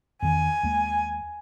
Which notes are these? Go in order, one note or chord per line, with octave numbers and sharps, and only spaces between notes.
E2 D#3 G#5
D#2 G#3 A#3